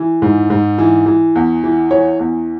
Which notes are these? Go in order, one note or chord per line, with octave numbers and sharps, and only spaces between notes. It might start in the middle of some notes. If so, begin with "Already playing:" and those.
Already playing: E3
G#2
G#2
E3
E3
E2
E3
E3 C#5
E2